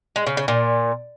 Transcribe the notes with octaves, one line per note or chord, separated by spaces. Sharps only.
G#3
C#3
C#3
A#2